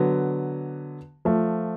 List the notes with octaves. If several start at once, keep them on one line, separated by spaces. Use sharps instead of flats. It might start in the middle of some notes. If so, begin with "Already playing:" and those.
Already playing: D3 F#3 B3
F3 A3